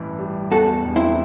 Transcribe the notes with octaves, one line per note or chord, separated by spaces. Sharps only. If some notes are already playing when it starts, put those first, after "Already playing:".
Already playing: A1 G2 E3
G3
E2 F#4 A4
E1
C4 E4